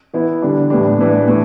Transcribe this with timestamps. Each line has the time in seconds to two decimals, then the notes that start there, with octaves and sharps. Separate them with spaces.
0.14 E3 B3 E4
0.42 D3 G3 D4
0.70 A2 E3 G3 D4
0.99 A2 E3 B3 D4
1.27 A2 E3 A3